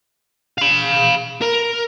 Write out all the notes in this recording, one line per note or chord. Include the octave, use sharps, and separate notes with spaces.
F5 B5
A#4